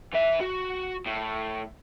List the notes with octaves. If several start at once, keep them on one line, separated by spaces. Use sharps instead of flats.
E3 E5
F#4
A2